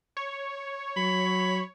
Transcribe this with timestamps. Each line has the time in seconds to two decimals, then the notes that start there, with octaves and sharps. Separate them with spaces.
0.17 C#5
0.97 F#3 B5